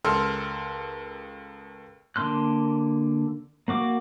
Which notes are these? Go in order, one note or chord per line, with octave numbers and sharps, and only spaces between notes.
C#2 A4 A#4 C6 E6 F6
D3 A#3 C6 F#6
A#3 F#4 D6